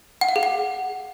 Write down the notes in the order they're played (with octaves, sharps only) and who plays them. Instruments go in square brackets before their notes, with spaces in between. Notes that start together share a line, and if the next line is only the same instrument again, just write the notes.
[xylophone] F#5
F5
G#4
F#5